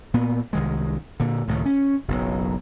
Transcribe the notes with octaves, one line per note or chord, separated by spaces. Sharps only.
A#2 B3
C2 D#3 G#3
A#2 D3
C#2 A2 D#3 A3
C#4
F#1 B1 F#3